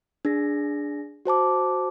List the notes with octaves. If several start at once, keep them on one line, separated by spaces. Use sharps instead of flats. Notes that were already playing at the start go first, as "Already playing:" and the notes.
D4 G#4 A#6
F#4 C5 A5 D6